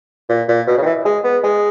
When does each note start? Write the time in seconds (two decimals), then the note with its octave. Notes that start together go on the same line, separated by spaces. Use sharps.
0.29 A#2
0.48 A#2
0.67 B2
0.77 C#3
0.82 D#3
0.86 E3
1.05 G#3
1.24 B3
1.43 G#3